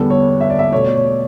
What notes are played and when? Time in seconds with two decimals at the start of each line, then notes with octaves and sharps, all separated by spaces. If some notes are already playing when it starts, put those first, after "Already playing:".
Already playing: E2 D3 G3 B3 A4
0.10 C#5
0.41 E5
0.50 D5
0.59 E5
0.72 B2 A3 C#5
0.84 D5
0.95 C#5